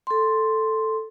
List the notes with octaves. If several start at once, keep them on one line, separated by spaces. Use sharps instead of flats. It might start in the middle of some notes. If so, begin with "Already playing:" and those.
A4 C6